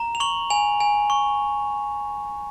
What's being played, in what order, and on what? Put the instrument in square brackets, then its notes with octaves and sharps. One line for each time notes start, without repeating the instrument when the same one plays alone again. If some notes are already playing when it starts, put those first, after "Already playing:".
Already playing: [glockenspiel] A#5
F7
C#6 F#7
G#5 F7
G#5
C#6